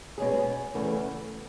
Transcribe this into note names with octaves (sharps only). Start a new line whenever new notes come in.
B2 G#3 C#4 G#4
E2 C#3 E3 A3